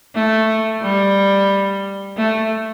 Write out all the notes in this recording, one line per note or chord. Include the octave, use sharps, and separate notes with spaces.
A3
G3
A3